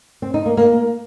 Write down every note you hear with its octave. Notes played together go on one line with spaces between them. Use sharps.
C4
D#4
A#3
A#3